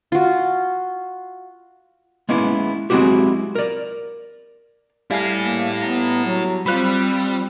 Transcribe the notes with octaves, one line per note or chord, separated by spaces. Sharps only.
F4 F#4
G#3 A#3 B3 C#4 E4
F#3 G#3 C4 E4 F#4 G4
A#4 D5
G3 E4 A4 F5 G#5 C7
A#3
B3 A#5
F#3
G3 C4 F4 C5 B5 E6 F#6